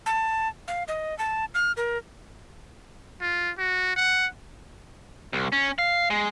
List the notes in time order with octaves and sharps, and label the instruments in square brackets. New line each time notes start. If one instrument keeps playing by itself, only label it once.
[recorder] A5
F5
D#5
A5
F6
A#4
[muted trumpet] F4
F#4
F#5
[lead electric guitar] C2
C#4
F5
G#3